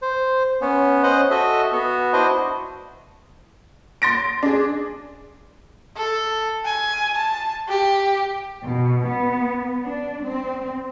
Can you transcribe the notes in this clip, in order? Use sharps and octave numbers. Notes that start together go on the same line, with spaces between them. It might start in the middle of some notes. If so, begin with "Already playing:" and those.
C5
B3 C#4
C#4 C5 D#5 F#5
F#4 A4 D#5 E5
B3 F#4
D4 E4 F#4 C5 D#5
C6 A6 A#6 D7
D4 G#4
A4
G#5
A5
G4
B2
B3
D4
C4